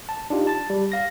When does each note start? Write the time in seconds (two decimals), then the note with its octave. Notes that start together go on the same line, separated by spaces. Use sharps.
0.09 A5
0.30 D4 D#4 F4 G4
0.47 A5 A6
0.70 G3
0.92 F5 A#6